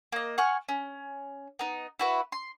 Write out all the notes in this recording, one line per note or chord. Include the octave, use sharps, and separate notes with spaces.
A#3 D#5
F#5 G#5 C#6 F6
C#4
B3 D#4
E4 F#4 B4
C6